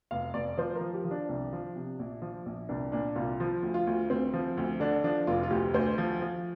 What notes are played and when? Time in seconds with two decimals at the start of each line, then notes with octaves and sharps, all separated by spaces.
0.11 F1 F5
0.34 F1 D5
0.57 F3 C5
0.75 A#4
0.81 F3
0.94 G4
1.05 F3
1.11 D4
1.29 C2
1.52 F3
1.76 C3
1.99 A#1
2.22 F3
2.46 A#1
2.69 C2 D4
2.92 A#2 D4
3.16 C2 F4
3.40 F3 F4
3.62 D2
3.74 F4
3.87 D2
4.10 D2 C4
4.34 F3
4.57 D2
4.80 D3 D4
5.04 F3 D4
5.27 F1 F4
5.43 F4
5.50 D2 G4
5.74 D2 C5
5.98 F3
6.22 F3